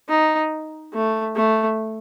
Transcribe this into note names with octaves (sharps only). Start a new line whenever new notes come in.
D#4
A3
A3